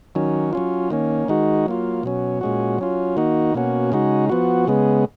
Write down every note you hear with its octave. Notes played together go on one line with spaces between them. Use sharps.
D#3 F#3 C#4
F#3 C#4 F4
D#3 A#3 C#4
D#3 G#3 D#4 F#4
F#3 A#3 F4
B2 F#3 C#4
A#2 G#3 C#4 F#4
F#3 C#4 F4
D#3 A#3 D#4 F#4
B2 A#3 C#4 F#4
C#3 G#3 D#4 F#4
F3 B3 F#4
C#3 G#3 B3